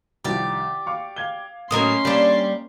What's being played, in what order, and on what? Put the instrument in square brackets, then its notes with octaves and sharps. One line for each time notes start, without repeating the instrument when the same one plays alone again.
[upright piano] C2 D#3 F3 [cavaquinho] G4 D5
[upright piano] F5 C#6 D6
F5 G#6 G7
[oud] A2 F#3 A#3 [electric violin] C#4 C6 [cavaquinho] A#4 D#5 D#6
[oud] G3 D4 [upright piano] A#3